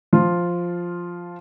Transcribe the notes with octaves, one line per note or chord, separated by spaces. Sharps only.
F3 F4